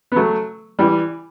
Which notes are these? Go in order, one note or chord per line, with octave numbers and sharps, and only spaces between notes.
B3
F#3 A3
E3 G3